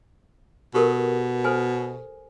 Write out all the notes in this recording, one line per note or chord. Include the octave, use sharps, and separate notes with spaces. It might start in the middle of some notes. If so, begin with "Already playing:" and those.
B2 G4 A4 A#4
A4 C5 G#5